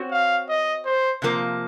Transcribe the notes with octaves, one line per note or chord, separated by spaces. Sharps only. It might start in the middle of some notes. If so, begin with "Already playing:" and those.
Already playing: C4 F#4 C#5
F5
D#5
C5
C3 F3 A#3